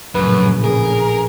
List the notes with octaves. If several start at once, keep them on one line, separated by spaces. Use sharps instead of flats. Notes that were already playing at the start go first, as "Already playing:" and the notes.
A#1 F#2 A2 C#3 B4
G#4 A#4